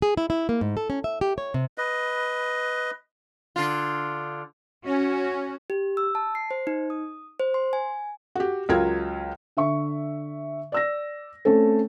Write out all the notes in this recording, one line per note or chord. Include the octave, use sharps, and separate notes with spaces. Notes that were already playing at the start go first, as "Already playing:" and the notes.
G#4
E4
E4
A#3
G#2
A4
C#4
E5
G4
C#5
C3
B4 D#5
D3 F4
C#4 F#4
G4
E6
A5
C7
C5
D#4
D#6
C5
C6
G#5
F#4 G4
C#2 F#3 F4 A#4 G#6
D3 E5 C#6
D5 E6 A#6
A3 C4 C#4 A4